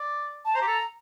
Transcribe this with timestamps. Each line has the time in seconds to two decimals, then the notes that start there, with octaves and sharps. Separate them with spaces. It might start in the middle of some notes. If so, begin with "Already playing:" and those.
Already playing: D5
0.45 A5
0.55 C5 A#5
0.62 G4
0.67 A4